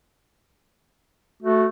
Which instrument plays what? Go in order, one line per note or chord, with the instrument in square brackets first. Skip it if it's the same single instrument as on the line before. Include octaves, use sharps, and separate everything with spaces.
[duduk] A3 [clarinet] F#4